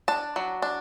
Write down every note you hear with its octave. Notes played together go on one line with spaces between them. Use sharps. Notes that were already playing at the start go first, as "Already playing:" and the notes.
D4 A5
F#3
D4